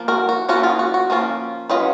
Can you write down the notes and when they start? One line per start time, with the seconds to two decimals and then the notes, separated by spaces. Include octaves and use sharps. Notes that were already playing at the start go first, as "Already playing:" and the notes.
Already playing: F3 A#3
0.08 F#4 A#4
0.29 F#4
0.49 F3 A#3 C#4 F4 F#4
0.63 F4 G#4
0.79 F#4
0.94 F#4
1.10 F3 A#3 C#4 F4
1.69 F#3 C#4 F4 B4 D#5